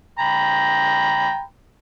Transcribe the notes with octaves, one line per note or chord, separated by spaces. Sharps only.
G5 A#5 B5